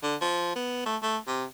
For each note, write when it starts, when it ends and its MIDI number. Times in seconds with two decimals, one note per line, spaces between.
0.03 0.15 50
0.21 0.55 53
0.56 0.83 59
0.86 0.97 57
1.02 1.18 57
1.27 1.44 48